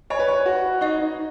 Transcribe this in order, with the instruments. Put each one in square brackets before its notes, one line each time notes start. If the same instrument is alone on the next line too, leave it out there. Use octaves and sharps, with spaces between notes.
[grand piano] C#5 [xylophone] D#5 G#5 B5
[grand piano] B4
C#5
F#4
[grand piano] D#4 [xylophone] D#5 F#5 C#6
[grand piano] D#4